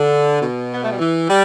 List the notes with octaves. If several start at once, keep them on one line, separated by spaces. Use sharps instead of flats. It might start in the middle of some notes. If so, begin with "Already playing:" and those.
Already playing: D3
B2
B3
A3
G3
E3
G3